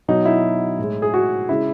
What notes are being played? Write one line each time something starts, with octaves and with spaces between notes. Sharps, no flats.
B2 F#3 D#4
E4
A2 G#3
G#4
F#4
C#3 G#3 E4